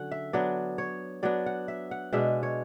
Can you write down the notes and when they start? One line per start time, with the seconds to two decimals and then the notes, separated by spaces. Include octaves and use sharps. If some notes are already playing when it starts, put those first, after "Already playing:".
Already playing: D3 F#3 C#4 F#5
0.11 E5
0.33 F#3 B3 D4 D5
0.78 C#5
1.23 F#3 B3 D4 D5
1.46 F#5
1.68 E5
1.91 F#5
2.13 B2 G#3 D4 E5
2.43 C#5